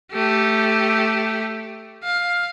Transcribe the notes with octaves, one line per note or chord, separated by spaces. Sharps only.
A3 G4
F5